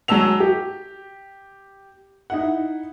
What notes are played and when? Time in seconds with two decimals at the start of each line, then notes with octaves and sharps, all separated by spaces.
0.08 F#3 G#3 A5 E6 F7
0.40 G4
2.30 D#4 E4 F#5